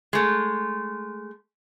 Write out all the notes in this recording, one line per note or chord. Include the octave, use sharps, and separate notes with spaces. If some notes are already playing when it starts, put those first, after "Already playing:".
G#3 A3